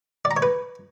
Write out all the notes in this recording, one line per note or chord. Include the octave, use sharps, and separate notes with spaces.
D5
A#5
C#5
B4